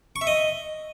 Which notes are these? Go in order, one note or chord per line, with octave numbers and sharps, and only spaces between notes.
C#6
E5
D#5